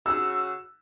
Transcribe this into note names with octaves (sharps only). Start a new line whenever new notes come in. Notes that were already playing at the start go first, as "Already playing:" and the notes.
C#3 F#4 E6